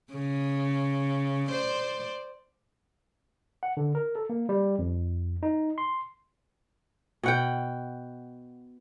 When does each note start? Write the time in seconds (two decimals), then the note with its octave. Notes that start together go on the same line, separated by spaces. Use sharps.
0.12 C#3
1.48 C5 D5
3.63 F#5
3.77 D3
3.95 A#4
4.16 A4
4.30 A#3
4.49 G3
4.79 F2
5.43 D#4
5.78 C6
7.23 B2 F#5 G5